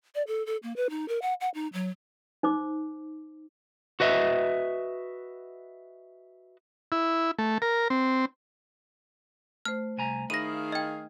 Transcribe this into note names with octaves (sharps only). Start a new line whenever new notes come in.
D5
A4
A4
A#3
B4
D#4
A#4
F#5
F#5
D#4
F#3
D#4 C5 D6
F#4 B4 D#5 E5
E4
A3
A#4
C4
A3 C5 F6
C2 G#5 A#5
D#3 D#4 E4 G#4 F5 A#6 D#7
D#5 G5 G#6